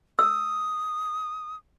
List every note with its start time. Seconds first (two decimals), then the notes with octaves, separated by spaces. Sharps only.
0.19 D#6 E6